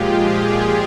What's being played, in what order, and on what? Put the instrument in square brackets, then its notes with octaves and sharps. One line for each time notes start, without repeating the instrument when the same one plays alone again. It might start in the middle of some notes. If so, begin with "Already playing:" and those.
Already playing: [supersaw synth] A#2 F3 G#3 F4 G4 G#4